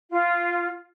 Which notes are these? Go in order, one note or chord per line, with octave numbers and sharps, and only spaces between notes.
F4